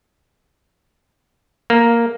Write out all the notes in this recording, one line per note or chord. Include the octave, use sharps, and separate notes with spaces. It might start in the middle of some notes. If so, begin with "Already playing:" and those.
A#3